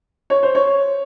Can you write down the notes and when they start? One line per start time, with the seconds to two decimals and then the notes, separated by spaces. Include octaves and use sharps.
0.30 C#5
0.43 C5
0.55 C#5